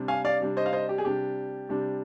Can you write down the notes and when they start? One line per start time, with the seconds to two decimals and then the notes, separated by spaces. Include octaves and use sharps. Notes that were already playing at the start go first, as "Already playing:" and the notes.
Already playing: C3 G3 D4
0.08 F5 G#5
0.25 D5 F5
0.40 C3 G3 D4
0.57 C5 D#5
0.66 F5
0.73 C5 D#5
0.89 G4
0.98 G#4
1.05 C3 G3 D4 G4
1.69 C3 G3 D4